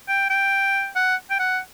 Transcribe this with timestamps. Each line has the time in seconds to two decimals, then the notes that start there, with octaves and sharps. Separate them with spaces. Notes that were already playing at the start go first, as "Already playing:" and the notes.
0.08 G5
0.30 G5
0.96 F#5
1.30 G5
1.39 F#5